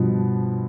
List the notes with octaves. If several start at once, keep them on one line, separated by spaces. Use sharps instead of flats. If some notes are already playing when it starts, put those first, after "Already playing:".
Already playing: G2 B2 F3 B3